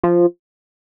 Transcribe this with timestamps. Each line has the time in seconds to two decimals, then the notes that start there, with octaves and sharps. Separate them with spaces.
0.04 F3